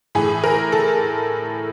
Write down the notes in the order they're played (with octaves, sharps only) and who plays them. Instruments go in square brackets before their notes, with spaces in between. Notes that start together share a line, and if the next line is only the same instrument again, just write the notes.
[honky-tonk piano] A2 E3 G#4
A#4
A4